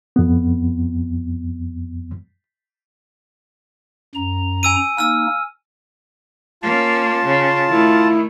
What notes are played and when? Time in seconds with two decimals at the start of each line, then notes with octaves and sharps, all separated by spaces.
0.16 F2 B3
4.15 F#2 A#5
4.63 G#5 E6 D#7
4.98 A#3 D#4 E6 F6
6.63 A#3 C#4 F4 A5
7.26 C#3
7.69 D#3 A3 E4